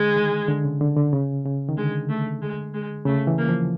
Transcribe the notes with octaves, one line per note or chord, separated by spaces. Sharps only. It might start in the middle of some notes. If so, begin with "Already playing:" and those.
Already playing: D3 G#3
D#3
D3
C#3
D3
D3
C#3
C#3
D#3
D3 G#3
A3
G#3
G#3
C#3 A3
E3
A#3
F3